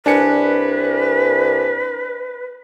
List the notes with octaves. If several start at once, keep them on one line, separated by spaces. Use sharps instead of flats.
C2 D4 B4 G#5 C#7